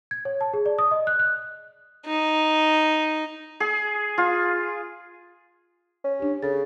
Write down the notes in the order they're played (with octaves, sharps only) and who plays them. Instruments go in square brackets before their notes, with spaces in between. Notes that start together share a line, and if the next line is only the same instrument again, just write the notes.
[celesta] G#6
C#5
A5
G#4
D5
D#6
D#5
F#6
F#6
[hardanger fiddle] D#4
[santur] G#4
F4
[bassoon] C#4
[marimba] D4 G4
[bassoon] C#3 [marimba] A4 A6